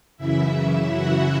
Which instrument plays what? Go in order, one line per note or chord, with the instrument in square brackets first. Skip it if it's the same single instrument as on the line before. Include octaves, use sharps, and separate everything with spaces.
[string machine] F#2 C#3 E3 E4 E5
F#4 F#5